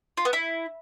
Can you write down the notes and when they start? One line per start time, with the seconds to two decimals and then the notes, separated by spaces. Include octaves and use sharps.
0.17 F4
0.25 B3
0.33 E4